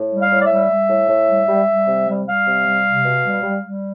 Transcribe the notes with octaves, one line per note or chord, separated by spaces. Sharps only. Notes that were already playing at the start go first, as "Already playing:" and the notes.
Already playing: A2
G3
F5
A2
D5
E5
G3
G3
A2
A2
G3
G3
G3
C3
G3
G3 F5
C3
G3
C3
B2
G3
G3
G3